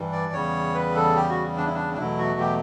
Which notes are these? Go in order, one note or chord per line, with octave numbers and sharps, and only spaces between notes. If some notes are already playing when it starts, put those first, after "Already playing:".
Already playing: G2 E3 G3
D5
E2 C#3 G3 C#5
B4
A4
G4
F#4
D4
E4
D4
D4
E2 B2 F#3 A3 E4
F#4
G4